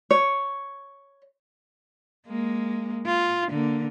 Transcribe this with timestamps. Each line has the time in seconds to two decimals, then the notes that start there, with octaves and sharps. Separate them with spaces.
0.11 C#5
2.27 G#3 A#3
3.06 F4
3.49 D3 A#3